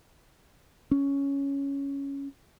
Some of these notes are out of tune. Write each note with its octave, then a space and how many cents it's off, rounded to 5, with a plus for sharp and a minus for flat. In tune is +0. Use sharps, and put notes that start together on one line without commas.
C#4 +5